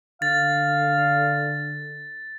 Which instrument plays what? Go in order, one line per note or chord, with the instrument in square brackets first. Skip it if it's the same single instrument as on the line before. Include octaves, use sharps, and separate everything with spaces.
[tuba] D3 [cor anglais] F5 [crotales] A6